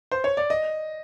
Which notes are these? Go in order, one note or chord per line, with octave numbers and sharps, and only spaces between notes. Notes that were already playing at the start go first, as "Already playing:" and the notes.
C5
C#5
D5
D#5